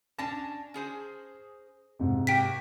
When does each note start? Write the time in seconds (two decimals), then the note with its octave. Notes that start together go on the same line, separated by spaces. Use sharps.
0.19 C#4 D4 A5 A#6
0.74 C#4 G#4 C5
1.99 G#2 C3
2.27 A#3 F#4 G4 G5 B6